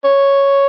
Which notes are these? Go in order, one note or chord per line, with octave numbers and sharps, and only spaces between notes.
C#5